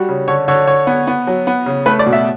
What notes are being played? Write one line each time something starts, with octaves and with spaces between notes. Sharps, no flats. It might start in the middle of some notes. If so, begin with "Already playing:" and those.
Already playing: G3 F#4
C#3
D3 C#5
D3 C#5
D3 C#5
B3
B3
F#3
B3
C#3
A3 B4
D5
B2
E5